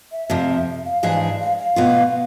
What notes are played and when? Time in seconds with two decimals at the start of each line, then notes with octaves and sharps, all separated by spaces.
0.12 E5
0.29 F2 C3 F3 F5
0.49 E5
0.85 F5
1.03 G#2 E3 G#3 D4 G#4 F5
1.21 F5
1.40 F5
1.58 F5
1.76 B2 B3 F4